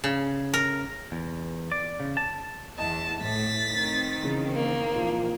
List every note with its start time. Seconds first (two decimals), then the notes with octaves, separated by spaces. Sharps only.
0.04 C#3
0.54 A#4
1.12 E2
1.72 D5
2.00 C#3
2.17 A5
2.78 E2 D#5 A5
3.21 A2 A6 B6
3.72 D#3 C4
4.23 C#3 E3
4.53 A#3
4.95 A#2 E3 F3